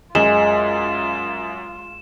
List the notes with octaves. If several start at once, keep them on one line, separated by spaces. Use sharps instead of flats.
F#2 G#3 F4 E7